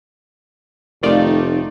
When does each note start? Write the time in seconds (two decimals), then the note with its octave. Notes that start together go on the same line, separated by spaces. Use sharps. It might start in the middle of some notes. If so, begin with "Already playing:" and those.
1.03 F1 D#3 A3 D#4 F4 D5